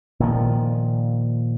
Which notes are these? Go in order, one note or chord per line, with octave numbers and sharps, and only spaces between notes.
A#2 D#3 F3